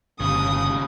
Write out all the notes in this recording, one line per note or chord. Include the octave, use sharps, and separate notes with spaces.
G1 D#2 C#3 D#6